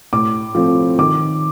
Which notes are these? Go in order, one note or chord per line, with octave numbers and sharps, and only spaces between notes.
A2 D6
F3 A3 C4
D#3 D6